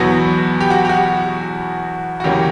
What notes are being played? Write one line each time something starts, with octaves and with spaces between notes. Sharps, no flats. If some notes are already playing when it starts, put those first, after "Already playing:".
Already playing: E2 B2 F#3 B3 F#4
G4
F#4
G4
F#4
F#4
E2 C#3 F#3 A#3 C#4 G4